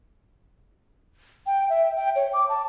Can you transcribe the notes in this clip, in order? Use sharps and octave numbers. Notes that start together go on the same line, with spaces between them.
G5
E5
G5
C#5
D6
A5